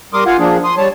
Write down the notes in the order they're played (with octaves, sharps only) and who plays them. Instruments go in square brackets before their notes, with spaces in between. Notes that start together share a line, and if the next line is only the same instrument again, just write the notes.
[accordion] G3 A#4 C6 D6 D#6
F4 F5 F#5 G#5
F3 A#3 D4 G#4
C6 D#6
G3 C#5 A5